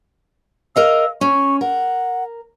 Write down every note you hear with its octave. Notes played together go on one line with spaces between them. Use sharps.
A#4 D#5 F5 E6
C#4 C#6
A#4 F#5